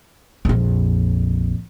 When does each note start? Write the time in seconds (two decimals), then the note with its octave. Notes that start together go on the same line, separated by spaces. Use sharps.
0.45 A#1 F2